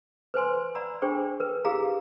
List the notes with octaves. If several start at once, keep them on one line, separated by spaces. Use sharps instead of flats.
B4 C5 G#5 C6
D5 F#5 A#5 B5 E6
D4 G#4 C5 G5 C#6
A#4 B4
E4 G4 G#4 A#4 F5 A#5